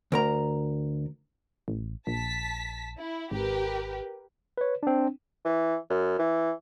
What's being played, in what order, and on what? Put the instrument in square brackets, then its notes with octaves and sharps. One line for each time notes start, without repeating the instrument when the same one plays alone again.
[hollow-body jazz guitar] D2 A#4 A#5
[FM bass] A1
[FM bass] A#1 [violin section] A5 B6
[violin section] E4
[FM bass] G#1 [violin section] G4 A#4 B4
[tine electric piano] B4 C#5
C4 D4
[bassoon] E3
F#2
E3